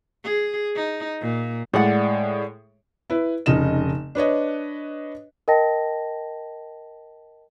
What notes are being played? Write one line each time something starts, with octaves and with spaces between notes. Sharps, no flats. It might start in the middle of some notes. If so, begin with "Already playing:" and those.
G#4
D#4
A#2
A2 G#3 D5 F#5
E4 B4
F1 C#3 D#4 D#5 E7
D4 B4 C#5 D#5
A#4 D#5 G5 A5 A#6